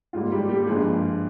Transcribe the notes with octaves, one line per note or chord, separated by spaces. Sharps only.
G#2 G3 A#3 F4
G3 G4
G3 G4
G2 F3 G#3 A#3 G#4